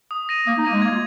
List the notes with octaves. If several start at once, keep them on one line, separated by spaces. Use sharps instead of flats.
D#6
A#6 D#7
A#3 D#6
D#4
A#3 A#6 D#7
G#3
A#3 G#6
F4